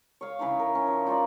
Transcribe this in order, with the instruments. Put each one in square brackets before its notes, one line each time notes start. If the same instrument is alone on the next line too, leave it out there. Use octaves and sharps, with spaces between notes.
[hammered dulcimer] C#5 F5
C#3 E3 D#4 C#5
A#4
C#4
F3
D#4 F4 D5